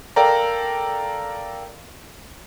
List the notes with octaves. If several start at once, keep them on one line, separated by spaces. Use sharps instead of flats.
A4 A#4 D5 F5 G5 A#5